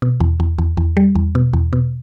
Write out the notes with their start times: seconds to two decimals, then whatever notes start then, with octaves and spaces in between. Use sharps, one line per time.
0.02 B2
0.20 E2
0.40 E2
0.58 E2
0.77 E2
0.97 G3
1.15 E2
1.35 B2
1.53 E2
1.73 B2